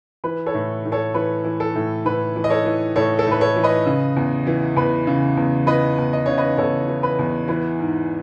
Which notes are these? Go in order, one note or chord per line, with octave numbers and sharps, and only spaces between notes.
E3 B4
A4 C#5
A2
A2
A4 C#5
E3 B4
E3
A4
A2
A2 B4
E3
D#5
A4 C#5
E3
A2 A4 C#5
A4
A2 B4
A4 C#5
E3
B4 D#5
C#3
E2
E3
E2 B4
C#3
E2
E3 B4 D#5
E2
D#5
C#3 C#5
B4 D#5
E2 A4 C#5
E3
B4
E2
E3 B4
G#2